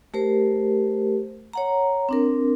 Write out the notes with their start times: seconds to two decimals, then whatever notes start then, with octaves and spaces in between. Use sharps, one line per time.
0.14 A3 G4 A#4 C5
1.53 C#5 F#5 A#5
2.09 C4 D4 A#4